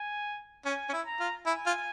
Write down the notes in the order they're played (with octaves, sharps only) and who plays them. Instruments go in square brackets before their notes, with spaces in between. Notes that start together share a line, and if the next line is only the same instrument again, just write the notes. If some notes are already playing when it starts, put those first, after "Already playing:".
Already playing: [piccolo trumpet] G#5
[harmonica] C#4 [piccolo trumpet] G#5
[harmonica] C#4
E4
[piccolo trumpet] A#5
[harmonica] F4
[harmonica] E4 [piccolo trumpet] G#5
[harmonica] F4